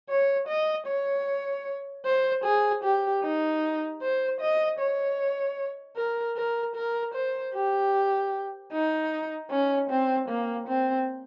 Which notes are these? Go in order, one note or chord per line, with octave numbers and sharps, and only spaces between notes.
C#5
D#5
C#5
C5
G#4
G4
D#4
C5
D#5
C#5
A#4
A#4
A#4
C5
G4
D#4
C#4
C4
A#3
C4